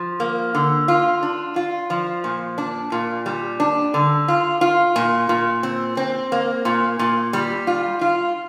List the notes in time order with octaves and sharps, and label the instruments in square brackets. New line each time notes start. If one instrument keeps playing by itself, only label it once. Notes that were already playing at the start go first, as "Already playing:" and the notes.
Already playing: [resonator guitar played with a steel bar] F3
A#3
D3
F4
D4
F4
F3
A#2
D4
A#2
G3
D4
D3
F4
F4
A#2
A#2
C4
C4
A#3
A#2
A#2
G3
F4
F4